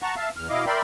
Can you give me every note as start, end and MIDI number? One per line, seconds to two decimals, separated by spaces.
0.02 0.15 78
0.02 0.15 81
0.02 0.15 82
0.02 0.15 85
0.16 0.29 76
0.16 0.29 77
0.16 0.29 81
0.36 0.48 40
0.36 0.48 89
0.50 0.65 47
0.50 0.65 64
0.50 0.65 75
0.50 0.65 77
0.50 0.65 86
0.66 0.82 70
0.66 0.82 74
0.66 0.82 76
0.66 0.82 79
0.66 0.82 83
0.66 0.82 84